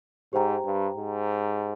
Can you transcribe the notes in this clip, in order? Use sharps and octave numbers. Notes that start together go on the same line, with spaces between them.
G#2 G4 C5 G5 A#5
G2
G#2